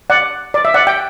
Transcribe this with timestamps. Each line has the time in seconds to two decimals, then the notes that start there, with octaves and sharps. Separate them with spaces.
0.10 D5 F#5
0.54 D5
0.65 E5
0.74 D5 F#5
0.87 G5